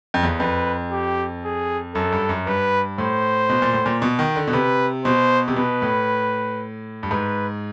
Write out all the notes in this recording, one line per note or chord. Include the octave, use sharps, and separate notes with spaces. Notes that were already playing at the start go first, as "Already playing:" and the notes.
F2
E2
F2 B4
G4
G#4
F#2 A4
G2
F#2
G2 B4
A2 C5
B2
A#2
A2
A#2
B2
D#3
D3
B2
C3 B4
B2 C5
C3
B2 B4
A2
G2
G#2 B4